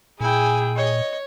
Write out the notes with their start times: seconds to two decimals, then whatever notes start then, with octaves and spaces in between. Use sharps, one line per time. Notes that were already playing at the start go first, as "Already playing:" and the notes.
0.21 A#2 E4 G#4 G5 G#5
0.76 C#5 D#5